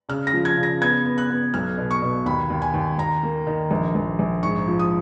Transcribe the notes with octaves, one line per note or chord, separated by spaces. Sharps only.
C#3 F6
A#6
F3
G#6
C#3
A#6
B3 G#6
B3
F#6
B3
B1 F6
B2
C#6
B2
D#2 B5
D#2
G#5
D#2
D#2 A#5
A#3
D#3
A#1
A#1
A#1
G#2 C#6
F3
D#6